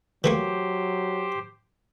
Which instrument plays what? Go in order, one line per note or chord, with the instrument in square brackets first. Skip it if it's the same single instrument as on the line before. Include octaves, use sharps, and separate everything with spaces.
[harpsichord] E3 A3 A#3 [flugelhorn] F#3 [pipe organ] G4 C5